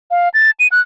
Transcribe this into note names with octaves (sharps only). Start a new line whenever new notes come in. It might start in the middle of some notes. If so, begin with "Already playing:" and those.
F5
A6
D#7
F#6